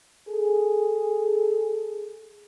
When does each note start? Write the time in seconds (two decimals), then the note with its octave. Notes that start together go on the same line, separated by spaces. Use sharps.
0.28 G#4 A4